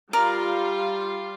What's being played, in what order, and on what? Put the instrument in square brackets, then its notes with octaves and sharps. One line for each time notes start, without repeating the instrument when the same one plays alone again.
[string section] G3 F4 [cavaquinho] A#4 D5 A#5